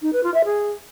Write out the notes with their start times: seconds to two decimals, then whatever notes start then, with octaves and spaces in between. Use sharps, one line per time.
0.02 D#4
0.13 B4
0.23 F4
0.34 E5
0.45 G#4